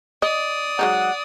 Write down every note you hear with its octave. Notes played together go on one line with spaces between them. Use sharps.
D5 D#5 D#6
F#3 G#3 D#4 F#5